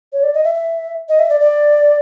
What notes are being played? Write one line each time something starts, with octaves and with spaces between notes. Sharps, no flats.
C#5
D5
D#5
E5
E5
D#5
E5
D5
D5